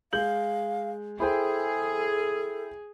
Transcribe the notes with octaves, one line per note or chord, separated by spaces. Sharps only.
G#3 F5 G6 F#7
E4 G#4 A4 C5 G5